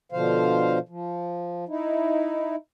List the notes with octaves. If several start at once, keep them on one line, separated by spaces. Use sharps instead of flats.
B2 D3 F3 C5 F5
F3
D#4 E4